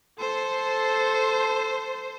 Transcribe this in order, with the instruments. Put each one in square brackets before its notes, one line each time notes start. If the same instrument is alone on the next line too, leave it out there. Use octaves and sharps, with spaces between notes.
[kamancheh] A4 [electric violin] C5